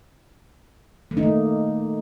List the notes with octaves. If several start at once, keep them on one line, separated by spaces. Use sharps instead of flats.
A3
D#4
A#3